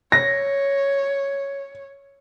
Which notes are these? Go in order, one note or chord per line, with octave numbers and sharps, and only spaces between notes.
C#5 A#6